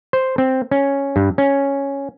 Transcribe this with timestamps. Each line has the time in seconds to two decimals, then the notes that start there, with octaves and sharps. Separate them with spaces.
0.13 C5
0.38 C4
0.71 C#4
1.16 G2
1.38 C#4